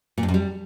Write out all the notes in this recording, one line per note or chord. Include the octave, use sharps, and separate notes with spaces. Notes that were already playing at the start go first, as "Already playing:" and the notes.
A#2
G2
F#2
G3